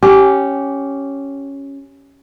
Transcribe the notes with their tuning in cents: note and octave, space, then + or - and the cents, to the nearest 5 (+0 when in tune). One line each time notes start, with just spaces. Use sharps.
C#4 +0 G4 -15